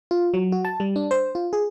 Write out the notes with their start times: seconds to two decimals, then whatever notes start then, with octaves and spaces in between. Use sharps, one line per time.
0.11 F4
0.34 F#3
0.52 F#4
0.65 A5
0.80 G3
0.96 D4
1.11 C5
1.35 F4
1.53 G#4